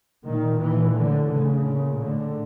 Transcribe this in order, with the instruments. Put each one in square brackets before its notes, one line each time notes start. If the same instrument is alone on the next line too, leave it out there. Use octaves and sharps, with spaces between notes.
[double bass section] A#2 D#3
A#2 E3
A2 D3
A2 C#3
A#2
A2 D3